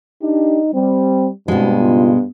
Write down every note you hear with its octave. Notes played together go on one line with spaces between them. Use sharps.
D4 D#4 G4
G3 C4
G2 B2 G#3 C4 E4 F#4
C#3 D#4 F4